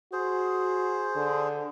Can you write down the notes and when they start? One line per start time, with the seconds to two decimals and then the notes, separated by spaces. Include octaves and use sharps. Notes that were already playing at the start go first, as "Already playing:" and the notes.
0.13 F#4 G#4 C5
1.16 D3